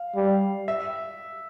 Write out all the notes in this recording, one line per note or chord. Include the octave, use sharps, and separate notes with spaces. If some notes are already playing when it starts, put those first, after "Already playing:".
Already playing: F5
G3
E5